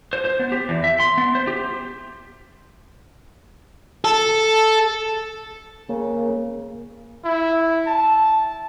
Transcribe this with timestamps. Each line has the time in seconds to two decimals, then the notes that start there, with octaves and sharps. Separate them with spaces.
0.13 C5
0.25 C5
0.39 B3
0.52 G4
0.69 E2
0.84 E5
1.00 C6
1.18 B3
1.35 C5
1.48 G4
4.05 A4
5.89 C#3 A#3
7.25 E4
7.87 A5